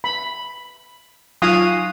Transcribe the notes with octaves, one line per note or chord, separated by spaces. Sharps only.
B5
F#3 D#4 F4 F5 G#5 D#6